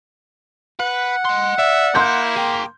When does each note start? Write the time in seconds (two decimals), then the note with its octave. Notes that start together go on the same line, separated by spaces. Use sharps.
0.80 B4 F#5
1.25 D#5 C6
1.59 D5 E5
1.95 A#3 E4 C6 G6
2.36 G#4 G5